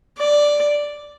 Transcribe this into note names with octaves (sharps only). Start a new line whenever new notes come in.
D5